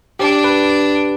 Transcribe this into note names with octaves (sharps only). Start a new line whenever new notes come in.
D4 G4
B4